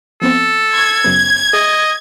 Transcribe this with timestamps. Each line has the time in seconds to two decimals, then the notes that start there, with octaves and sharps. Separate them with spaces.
0.22 F3 B3 C4 A4
0.73 C6 C#6 G#6
1.04 F#2 C#3 B3
1.53 G#4 D#5 E5